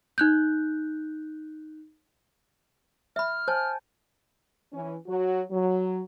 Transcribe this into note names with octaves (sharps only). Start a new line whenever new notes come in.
D#4 F#6 G6
E5 B5 F6
C5 G#5 A5 G6
E3 C#4
F#3 F#4
F#3